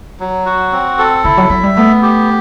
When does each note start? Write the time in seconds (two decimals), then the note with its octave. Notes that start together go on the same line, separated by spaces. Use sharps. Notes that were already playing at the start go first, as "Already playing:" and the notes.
0.20 F#3
0.46 F#4
0.72 C4
0.99 A4
1.24 D3 E4
1.37 F#3
1.50 F#3 E5
1.63 G3
1.77 A3 B3
2.02 G4